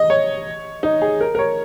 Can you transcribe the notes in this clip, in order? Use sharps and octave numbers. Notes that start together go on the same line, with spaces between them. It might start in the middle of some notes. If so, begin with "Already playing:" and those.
Already playing: D#5
C#5
D#4
G#4
A#4
A#4
C#5